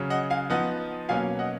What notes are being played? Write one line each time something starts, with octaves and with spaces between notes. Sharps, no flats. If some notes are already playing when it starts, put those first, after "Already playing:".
Already playing: C#3 F#3 C#4
D#5 F#5
F5 G#5
F3 B3 D#4 D#5 F#5
B2 F#3 A#3 C#4 F5 G#5
D#5 F#5